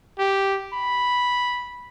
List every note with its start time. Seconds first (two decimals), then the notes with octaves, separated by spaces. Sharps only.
0.19 G4
0.73 B5